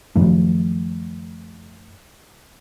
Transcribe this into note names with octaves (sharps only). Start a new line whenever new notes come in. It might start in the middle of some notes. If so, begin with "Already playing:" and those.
F#2 D#3 F3 A3